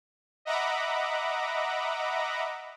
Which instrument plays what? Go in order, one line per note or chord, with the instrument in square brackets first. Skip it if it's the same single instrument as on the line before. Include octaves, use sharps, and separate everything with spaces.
[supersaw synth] D#5 E5 F#5 A#5 B5 D6